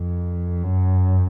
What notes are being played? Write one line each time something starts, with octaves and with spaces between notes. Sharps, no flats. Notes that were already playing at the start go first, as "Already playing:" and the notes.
Already playing: F2
F#2